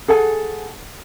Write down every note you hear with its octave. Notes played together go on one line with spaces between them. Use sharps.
G#4 A4 F#5 G#5